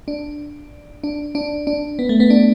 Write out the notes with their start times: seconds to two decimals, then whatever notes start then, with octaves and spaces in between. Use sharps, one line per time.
0.08 D4
1.04 D4
1.35 D4
1.67 D4
1.99 B3
2.09 A3
2.20 B3
2.30 D4